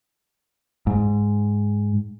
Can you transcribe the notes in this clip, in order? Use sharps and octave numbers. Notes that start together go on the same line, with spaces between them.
G#2